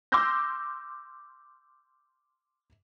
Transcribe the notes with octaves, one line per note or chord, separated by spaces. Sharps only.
C6 D6 E6 F6 G6 A#6